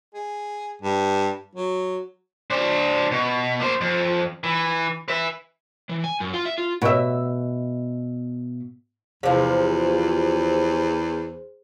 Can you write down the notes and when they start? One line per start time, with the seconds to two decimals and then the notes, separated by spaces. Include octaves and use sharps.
0.14 G#4
0.82 G2
1.56 F#3
2.50 D4 C5
3.11 B2
3.61 A#3 C5
3.81 F2
4.44 E3
5.08 B4 E5
5.89 E3
6.04 G#5
6.20 F#2
6.33 F4
6.45 E5
6.58 F4
6.82 B2 E5
9.23 E2 C3 F3 G#4 C5